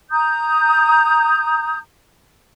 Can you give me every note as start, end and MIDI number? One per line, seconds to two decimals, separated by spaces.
0.11 1.78 82
0.11 1.78 87
0.11 1.78 91